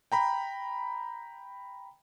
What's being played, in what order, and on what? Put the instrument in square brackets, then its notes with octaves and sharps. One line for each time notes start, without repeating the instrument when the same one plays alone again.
[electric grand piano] G5 A#5 B5